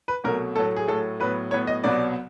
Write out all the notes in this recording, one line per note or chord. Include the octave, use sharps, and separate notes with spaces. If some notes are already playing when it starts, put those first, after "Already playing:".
B4
C2 B2 F#3 A3 A#4
A2 F#3 A3 A4
G#4
A2 F#3 A3 A4
A2 F#3 B3 B4
A2 F#3 B3 C#5
D#5
C2 B2 F#3 B3 D5